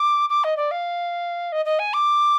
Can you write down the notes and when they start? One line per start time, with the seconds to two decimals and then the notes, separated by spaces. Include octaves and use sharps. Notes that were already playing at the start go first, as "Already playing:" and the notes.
Already playing: D6
0.30 D6
0.44 D#5
0.57 D5
0.71 F5
1.52 D#5
1.65 D#5
1.79 G#5
1.94 D6